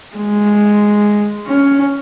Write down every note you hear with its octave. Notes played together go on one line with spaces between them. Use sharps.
G#3
C#4